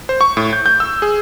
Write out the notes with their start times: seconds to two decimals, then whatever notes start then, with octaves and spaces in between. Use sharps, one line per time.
0.09 C5
0.21 C#6
0.37 A2
0.53 G6
0.66 G6
0.80 E6
1.02 G#4